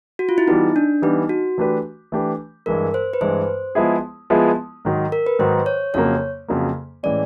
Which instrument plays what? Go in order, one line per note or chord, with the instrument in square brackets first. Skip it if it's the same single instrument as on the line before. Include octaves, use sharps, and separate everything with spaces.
[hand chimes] F#4
F4
E4
[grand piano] E3 G3 B3 [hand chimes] D#4
[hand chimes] D4
[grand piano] E3 G3 B3 [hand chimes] D#4
[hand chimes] F#4
[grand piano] E3 A3 D4 G4 B4
E3 A3 D4 G4 B4
[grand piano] G2 E3 G#3 [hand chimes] A#4
[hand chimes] C5
B4
[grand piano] G2 E3 G#3 [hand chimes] C5
[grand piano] F3 G#3 B3 E4 G#4
F3 G#3 B3 E4 G#4
G#2 D#3 F#3
[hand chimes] A#4
B4
[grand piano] G#2 D#3 F#3 [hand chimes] C5
[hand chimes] C#5
[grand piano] F2 C#3 F#3 A#3 [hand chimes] C#5
[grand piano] F2 C#3 F#3 A#3
[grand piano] A2 E3 G#3 C#4 [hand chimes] D5